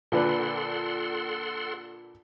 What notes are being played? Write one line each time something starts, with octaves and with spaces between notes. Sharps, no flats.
A#2 D3 A4 B4 F#5 C6